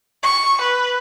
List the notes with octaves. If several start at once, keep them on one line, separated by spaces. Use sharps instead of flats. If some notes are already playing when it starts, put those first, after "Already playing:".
C#6
B4